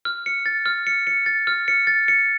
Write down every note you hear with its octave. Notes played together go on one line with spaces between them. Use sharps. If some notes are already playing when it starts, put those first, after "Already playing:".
F6
C#7
A6
F6
C#7
C#7
A6
F6
C#7
A6
C#7